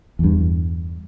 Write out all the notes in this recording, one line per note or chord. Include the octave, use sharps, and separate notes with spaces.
E2 G2